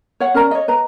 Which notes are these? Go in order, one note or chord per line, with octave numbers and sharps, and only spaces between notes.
C#5 F#5
C#4 A#4 D5 A#5
C#5 D#5
B4 D#5 A#5